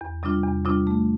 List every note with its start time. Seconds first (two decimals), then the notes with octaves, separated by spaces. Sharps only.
0.01 E2
0.23 C3 G3 D4 F4
0.44 E2
0.65 C3 G3 D4 F4
0.87 A3